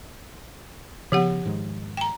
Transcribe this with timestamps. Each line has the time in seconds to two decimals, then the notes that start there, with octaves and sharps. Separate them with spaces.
1.12 C#3 F3 B3 G4 F#5
1.45 G#2 D#3 G#3
1.97 G5 A#5